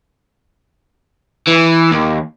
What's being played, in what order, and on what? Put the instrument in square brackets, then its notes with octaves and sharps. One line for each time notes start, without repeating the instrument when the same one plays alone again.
[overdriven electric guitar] E3
D#2